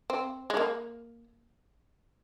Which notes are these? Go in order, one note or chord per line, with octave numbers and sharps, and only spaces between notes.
C4
G#3
A#3